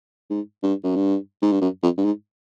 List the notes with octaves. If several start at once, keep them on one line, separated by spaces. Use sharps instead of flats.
G#2
G2
F#2
G2
G#2
G2
F#2
F2
G2
G#2